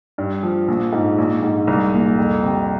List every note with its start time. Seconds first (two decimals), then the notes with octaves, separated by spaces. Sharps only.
0.18 G2
0.43 F3
0.68 A#1
0.93 G#2
1.18 A#1
1.43 G#2
1.67 C2
1.93 A#2
2.18 F2
2.43 C3